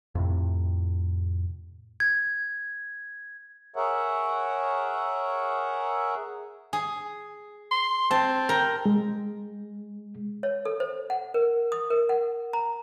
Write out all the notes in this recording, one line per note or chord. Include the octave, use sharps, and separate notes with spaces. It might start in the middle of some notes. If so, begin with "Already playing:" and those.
F2 A2 C3
G#6
G#4 A#4 C#5 E5 F#5
G#4
C6
C4 A5
A#4 G5
G#3
C#5
A4
C5
F#5
A#4
D#6
A#4
F#5
A#5